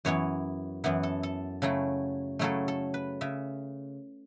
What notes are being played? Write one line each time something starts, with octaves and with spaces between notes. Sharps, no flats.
F#2 E3 B3 E4 C#5
F#2 E3 B3 E4 F#5
A4
A4
C#3 F#3 A3 E4 A4
C#3 F#3 A3 E4 A4
A4
B4
C#3 E5